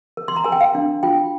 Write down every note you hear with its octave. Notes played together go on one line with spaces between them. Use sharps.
A#4
C6
A#5
A#4 G#5
G5
F5
D4
F4 G5